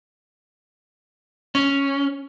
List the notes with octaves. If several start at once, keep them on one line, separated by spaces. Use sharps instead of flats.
C#4